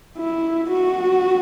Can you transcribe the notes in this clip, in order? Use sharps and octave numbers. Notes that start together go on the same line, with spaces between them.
E4
F#4